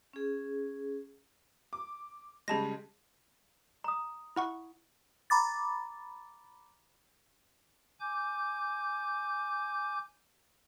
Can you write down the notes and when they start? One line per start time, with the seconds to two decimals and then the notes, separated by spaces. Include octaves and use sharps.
0.13 C#4 G#4
1.73 D6
2.48 C#3 G3 G#3 G#4 A5 A#6
3.84 A#5 D#6
4.36 E4 F#5 C#6
5.30 A#5 B5 D6 A6
8.00 G#5 D6 G6